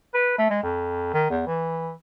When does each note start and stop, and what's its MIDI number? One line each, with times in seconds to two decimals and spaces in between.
0.14 0.35 71
0.38 0.50 57
0.50 0.62 56
0.63 1.09 41
1.13 1.28 51
1.30 1.44 40
1.47 1.90 52